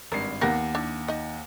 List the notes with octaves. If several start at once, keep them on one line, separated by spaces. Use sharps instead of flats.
G#1 G2 A#4 C7
D#2 B3 G4 A#4 F#5 A#6
D4 E4
D#4 D#5